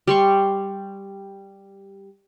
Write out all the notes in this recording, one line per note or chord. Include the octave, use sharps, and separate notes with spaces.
G3 C6 C#6